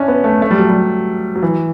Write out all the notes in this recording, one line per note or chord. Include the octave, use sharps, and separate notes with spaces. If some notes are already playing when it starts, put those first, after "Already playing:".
Already playing: C#4 D4 E4
B3
A3
A3
G3
F#3
G3
F#3
E3